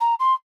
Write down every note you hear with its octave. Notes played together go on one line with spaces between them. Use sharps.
A#5
C6